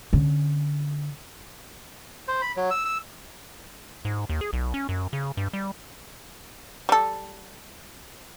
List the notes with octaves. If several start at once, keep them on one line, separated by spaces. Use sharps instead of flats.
D3 C#4
C5
B5
F#3
E6
E6
G#2
D#2
G#4
B1
C#4
F#2
C#3
G2
G3
G3 A4